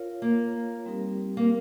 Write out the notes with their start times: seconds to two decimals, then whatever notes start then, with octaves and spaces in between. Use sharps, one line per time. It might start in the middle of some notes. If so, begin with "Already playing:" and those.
Already playing: F4 A#4 C#5 F5
0.22 A#3
0.86 G3 C4 D#4 G4 A#4
1.37 A#3